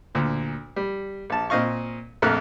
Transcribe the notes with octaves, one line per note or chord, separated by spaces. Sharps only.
D2 A#2
G3
A#1 A5
A#2 C4 D#5 F5 C#6
A#1 F2 A3 A#3 F6 F#6